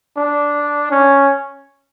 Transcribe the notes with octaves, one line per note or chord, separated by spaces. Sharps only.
D4
C#4